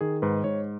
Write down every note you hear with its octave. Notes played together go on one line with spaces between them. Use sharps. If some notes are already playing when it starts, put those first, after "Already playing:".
D#3 G#4
G#2 B4
G#2 C#5